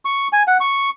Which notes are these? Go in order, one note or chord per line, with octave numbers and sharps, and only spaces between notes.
C#6
G#5
F#5
C#6